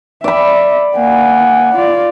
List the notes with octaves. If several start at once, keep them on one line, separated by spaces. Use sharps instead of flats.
D5 E5 B5
A#3 F#5 G#5
F4 D5